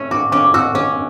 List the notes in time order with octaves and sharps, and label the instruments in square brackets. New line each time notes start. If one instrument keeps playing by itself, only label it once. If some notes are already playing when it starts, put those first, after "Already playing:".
Already playing: [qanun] A3 C#4 [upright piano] E6
[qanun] F#4 [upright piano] D6
[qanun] C#4 [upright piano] D6
[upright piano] D6
[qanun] F#4 [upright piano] E6
[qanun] C#4 [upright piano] D6